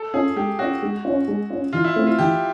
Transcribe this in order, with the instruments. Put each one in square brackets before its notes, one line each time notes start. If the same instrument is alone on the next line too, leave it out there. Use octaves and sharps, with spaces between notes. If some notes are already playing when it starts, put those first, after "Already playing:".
Already playing: [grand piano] A4
[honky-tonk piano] C#4 F4 [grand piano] G#4
[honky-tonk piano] G#3 [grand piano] G4
[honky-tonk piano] C#4 F4 [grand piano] F#4
[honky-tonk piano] G#3
C#4 F4
G#3
C#4 F4
[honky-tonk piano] E3 [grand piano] F4
[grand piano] E4
[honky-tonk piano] A3 C4
[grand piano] F4
[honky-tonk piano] E3 [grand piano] G4